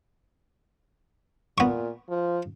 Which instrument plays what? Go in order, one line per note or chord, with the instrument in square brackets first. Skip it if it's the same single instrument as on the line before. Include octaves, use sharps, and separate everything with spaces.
[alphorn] A#2 [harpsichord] B3 C#6
[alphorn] F3